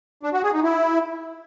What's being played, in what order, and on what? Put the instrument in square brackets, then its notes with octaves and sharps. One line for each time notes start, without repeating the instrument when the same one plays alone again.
[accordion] D4
F#4
G#4
D#4
E4